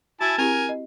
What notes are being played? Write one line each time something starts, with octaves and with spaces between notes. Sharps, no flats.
E4 F#4 G#5 A5
C4 E4 G4 A#4 G#5
D#5